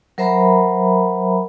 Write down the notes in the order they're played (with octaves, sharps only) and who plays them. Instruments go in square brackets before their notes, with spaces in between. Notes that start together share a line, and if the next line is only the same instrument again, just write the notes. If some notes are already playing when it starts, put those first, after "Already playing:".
[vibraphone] F#3 A#4 C5 E5 A#5 B5